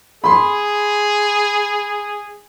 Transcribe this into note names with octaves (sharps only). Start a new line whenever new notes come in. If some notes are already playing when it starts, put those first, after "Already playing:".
G#4 B5 C6